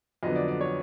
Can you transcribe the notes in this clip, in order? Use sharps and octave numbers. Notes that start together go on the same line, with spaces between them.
F2 D3 F#3 B3 D#5
D5
D5
C#5